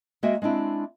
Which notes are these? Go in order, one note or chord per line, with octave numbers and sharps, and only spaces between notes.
G#3 A#3 F#4 D#5 E5 G5
G#3 C4 D4 E4